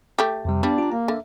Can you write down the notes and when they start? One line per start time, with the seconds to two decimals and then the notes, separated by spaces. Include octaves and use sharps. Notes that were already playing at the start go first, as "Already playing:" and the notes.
0.19 A3 G4
0.45 F2 C3 G3
0.63 G3 B3 D4 F5
0.78 F4 A#5
0.92 A#3 A#5
1.08 D3 E5